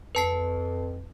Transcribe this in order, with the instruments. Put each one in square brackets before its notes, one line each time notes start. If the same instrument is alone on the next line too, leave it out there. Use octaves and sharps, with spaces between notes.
[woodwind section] F2 [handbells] B4 A5 C7